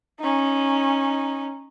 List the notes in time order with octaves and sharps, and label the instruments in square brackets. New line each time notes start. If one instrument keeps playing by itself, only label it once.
[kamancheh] C#4 D#4